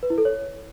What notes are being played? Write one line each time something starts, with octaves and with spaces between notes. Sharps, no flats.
B4
E4
A4
C#5